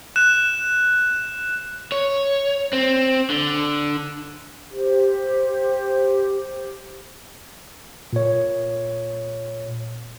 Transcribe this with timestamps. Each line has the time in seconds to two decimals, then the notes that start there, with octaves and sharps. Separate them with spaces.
0.16 F#6 E7
1.92 C#5
2.73 C4
3.30 D3
4.71 G4 C5
8.13 A#2 C#5